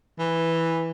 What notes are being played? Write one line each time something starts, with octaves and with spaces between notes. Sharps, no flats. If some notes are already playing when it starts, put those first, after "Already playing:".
E3